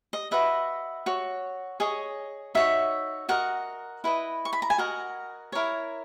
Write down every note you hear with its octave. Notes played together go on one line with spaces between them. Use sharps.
D#5
F#4 B4 D#5 E5
F#4 C#5
G#4 C#5 D#5
D#4 F#4 C#5 E5
F#4 A#4 D#5 F#5
E4 B4 D#5
C#6
B5
A#5
G#5
F#4 A#4 D#5 F#5
E4 A#4 C#5